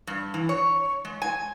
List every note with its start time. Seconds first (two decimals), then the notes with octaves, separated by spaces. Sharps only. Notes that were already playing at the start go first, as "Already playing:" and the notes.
0.07 G2
0.34 E3
0.49 C#5
1.05 G#3
1.22 G#5